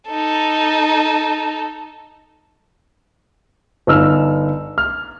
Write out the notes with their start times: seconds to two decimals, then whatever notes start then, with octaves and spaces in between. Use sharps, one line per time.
0.10 D#4 A4
3.87 G1 D#4 E6 F6
4.78 F6